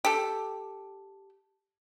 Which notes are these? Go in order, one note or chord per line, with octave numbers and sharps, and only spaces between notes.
G4 A4